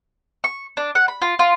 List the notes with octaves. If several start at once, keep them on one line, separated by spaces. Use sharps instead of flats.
C#6
D4
F#5
B5
F4
F4